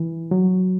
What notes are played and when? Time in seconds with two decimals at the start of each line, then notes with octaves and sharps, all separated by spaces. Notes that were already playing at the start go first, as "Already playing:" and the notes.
Already playing: E3
0.31 F#3